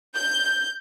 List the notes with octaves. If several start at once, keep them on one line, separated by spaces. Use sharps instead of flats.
G6